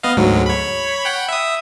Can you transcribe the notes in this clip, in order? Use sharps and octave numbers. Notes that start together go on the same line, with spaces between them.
B3 D#5 F5
D2 G#2 F#3
C#5 B5
F#5 G5 B5
E5 D#6